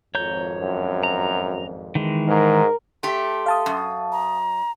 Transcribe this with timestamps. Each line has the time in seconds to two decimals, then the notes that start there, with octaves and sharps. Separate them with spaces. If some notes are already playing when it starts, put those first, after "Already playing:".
0.15 G#1 F2 C#5 A#5 G6
0.60 F#2
1.03 A#5
1.95 D#3 E3 G#3
2.28 G#2 A#4
3.03 A3 G4 C6
3.46 F5 A5 D#6
3.66 F#2
4.12 A#5